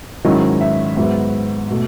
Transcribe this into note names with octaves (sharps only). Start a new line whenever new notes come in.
G#2 D#3 F#3 C#4 E4 D#5
E5
G#2 F#3 B3 E5
B2 A3